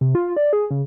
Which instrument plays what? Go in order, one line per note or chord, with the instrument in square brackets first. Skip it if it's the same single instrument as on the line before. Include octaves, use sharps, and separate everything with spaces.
[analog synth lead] C3
F4
D5
G#4
C#3